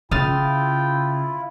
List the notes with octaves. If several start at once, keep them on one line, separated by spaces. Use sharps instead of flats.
C#3 E4 F4 G5 D#6 F6 A6